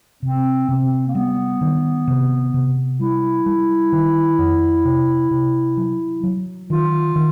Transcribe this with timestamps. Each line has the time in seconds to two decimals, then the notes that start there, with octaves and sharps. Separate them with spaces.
0.23 C3 C4
0.69 C3 C4
1.08 A#3
1.15 G3 B3
1.61 D#3
2.07 C3
2.54 C3
3.00 G3 E4
3.46 G3
3.92 D#3
4.38 F2
4.85 C3
5.31 C3
5.77 F#3
6.23 F#3
6.70 D#3 F4
7.16 D#3